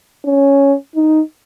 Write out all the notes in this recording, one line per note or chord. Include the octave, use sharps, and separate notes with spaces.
C#4
D#4